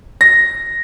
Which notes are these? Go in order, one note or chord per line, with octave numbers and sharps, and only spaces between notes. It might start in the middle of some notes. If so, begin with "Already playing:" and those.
A#6